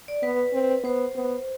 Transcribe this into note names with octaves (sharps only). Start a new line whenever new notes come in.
D5
B3 B4
C4
B3 C5
B3